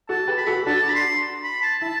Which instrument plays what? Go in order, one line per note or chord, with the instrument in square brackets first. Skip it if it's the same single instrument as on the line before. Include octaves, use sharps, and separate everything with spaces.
[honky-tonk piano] F#4 A4 [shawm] A5
[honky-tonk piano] G4 B4
[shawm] B5
[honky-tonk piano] F#4 A4
[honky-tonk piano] D4 F#4 [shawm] A5
[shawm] B5
C6
B5
A5
[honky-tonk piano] E4 [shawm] A5